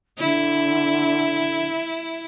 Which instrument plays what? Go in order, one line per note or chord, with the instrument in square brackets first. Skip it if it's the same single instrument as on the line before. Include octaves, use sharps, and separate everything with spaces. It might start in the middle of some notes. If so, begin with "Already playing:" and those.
[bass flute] D3 [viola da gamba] E4